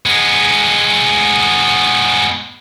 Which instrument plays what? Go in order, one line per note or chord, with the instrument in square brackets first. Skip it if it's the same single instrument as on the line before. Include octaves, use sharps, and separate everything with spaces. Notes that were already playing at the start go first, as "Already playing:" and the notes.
[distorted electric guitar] G#3 B3